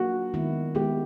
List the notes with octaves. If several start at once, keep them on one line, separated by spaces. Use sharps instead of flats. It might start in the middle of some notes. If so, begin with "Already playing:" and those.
Already playing: F#3 A#3 D4 F4 F#4
D#3 G#3 B3 E4
D#3 G#3 B3 E4 G4